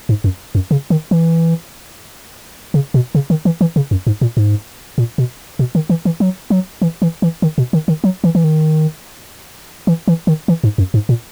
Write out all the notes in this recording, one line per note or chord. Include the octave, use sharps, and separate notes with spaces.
G#2
F#2
F#2
C#3
D#3
E3
C#3
B2
C#3
D#3
E3
E3
C#3
F#2
G#2
A#2
G#2
A#2
B2
B2
D#3
E3
E3
F#3
F#3
E3
E3
E3
D#3
B2
D#3
D#3
F#3
E3
E3
D#3
E3
E3
D#3
E3
G#2
F#2
G#2
A#2